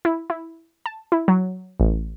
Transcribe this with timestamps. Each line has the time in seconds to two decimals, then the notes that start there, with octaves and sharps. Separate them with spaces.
0.05 E4
0.30 E4
0.86 A5
1.12 E4
1.28 F#3
1.80 A1